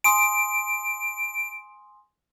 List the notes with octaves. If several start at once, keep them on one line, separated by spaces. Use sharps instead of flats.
G#5 C6 D#6 D7